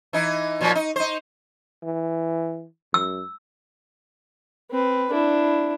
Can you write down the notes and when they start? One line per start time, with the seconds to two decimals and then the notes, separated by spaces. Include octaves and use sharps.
0.13 E3 D#4
0.61 A#2 F3 F#3
0.75 D#4
0.96 D#4 C5
1.83 E3
2.94 F#2 E6
4.71 C4 B4
5.11 D4 E4